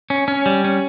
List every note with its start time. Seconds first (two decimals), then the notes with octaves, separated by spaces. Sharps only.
0.10 C#4
0.28 C#4
0.46 G3
0.64 C#4